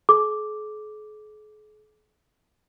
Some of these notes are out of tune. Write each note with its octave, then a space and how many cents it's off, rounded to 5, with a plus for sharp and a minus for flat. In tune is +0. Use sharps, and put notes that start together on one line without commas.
G#4 +45 D6 +0